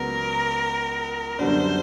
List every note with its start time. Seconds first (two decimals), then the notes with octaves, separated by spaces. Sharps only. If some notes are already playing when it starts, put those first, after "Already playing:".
Already playing: C#2 F#3 B3 A#4
1.39 F#2 D3 G3 B3 D4 C5